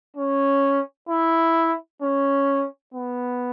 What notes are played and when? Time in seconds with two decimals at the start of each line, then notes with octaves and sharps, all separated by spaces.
0.16 C#4
1.09 E4
2.02 C#4
2.94 B3